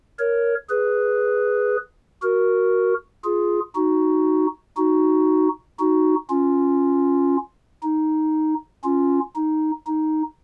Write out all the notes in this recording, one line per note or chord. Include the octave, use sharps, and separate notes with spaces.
A#4 C#5
G#4 B4
F#4 A#4
F4 G#4
D#4 F#4
D#4 F#4
D#4 F#4
C#4 F4
D#4
C#4 F4
D#4
D#4